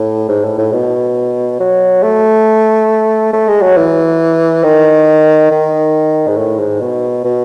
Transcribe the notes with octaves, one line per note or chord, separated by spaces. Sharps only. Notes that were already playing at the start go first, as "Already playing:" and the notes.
Already playing: A2
G#2
A2
A2
B2
F#3
A3
A3
G#3
F#3
E3
D#3
D#3
G#2
A2
G#2
B2
B2